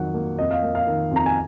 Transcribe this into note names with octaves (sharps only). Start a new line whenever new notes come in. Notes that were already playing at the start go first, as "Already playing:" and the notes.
Already playing: F2 D#3 F#3 F#5
A#3
F2 D#5
F5
A#3
F5
D#3
F2 A#5
G#5